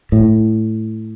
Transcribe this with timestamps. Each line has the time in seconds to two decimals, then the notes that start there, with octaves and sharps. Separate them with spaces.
0.12 A2